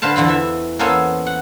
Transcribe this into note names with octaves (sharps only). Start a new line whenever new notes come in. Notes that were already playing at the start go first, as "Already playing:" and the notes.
D3 B4 C5 F5 A5
E2 D3 F4 B5
E3 E5
A#3 B3 C#4 A4 C5 G#5
F#5